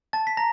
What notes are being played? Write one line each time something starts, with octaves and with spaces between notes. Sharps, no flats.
A5 A6
B6
A#5 A#6